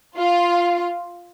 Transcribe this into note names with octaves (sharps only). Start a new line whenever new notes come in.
F4